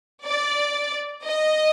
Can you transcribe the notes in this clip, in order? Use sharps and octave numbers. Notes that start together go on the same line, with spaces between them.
D5
D#5